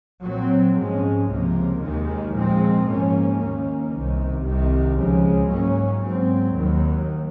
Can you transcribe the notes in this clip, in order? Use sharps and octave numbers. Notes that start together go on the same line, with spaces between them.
A#2 F#3 C4
G#2 F3 G#3 C#4
C#2 C3 F3 A#3
D#2 D#3 G#3
A#2 F3 G#3 C4
G#2 F3 A#3 C#4
D#2 D#3 A#3 C#4
C2 C3 D#3
C2 C3 D#3
C#2 C#3 F3 G#3
G#2 F#3 A#3 C#4
G#2 F#3 C4
D#2 D#3 F#3